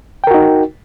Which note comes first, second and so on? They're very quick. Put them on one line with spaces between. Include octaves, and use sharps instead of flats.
G5 A#4 F#4 D#4